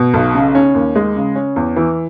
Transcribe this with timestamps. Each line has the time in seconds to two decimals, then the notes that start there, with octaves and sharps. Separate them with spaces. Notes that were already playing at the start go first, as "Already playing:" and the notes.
Already playing: B2
0.14 B1
0.35 C#3
0.55 C#4
0.75 D#2
0.96 G#3
1.16 C#3
1.36 C#4
1.56 E2
1.76 E3